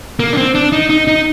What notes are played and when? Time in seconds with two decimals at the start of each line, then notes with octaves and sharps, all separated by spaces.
0.19 A#3
0.33 D4
0.37 C4
0.55 D4
0.72 D#4
0.90 D#4
1.08 D#4